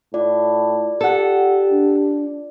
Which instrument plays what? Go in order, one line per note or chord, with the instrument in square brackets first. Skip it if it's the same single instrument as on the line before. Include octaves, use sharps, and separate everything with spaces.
[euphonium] A2 [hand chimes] F4 D5
[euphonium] G4 [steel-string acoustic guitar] A4 F#5
[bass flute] D4